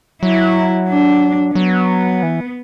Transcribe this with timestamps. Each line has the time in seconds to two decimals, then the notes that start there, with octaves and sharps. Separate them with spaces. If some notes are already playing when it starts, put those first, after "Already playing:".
0.23 F#3 E4
0.89 D4
1.55 F#3 B3
2.23 E3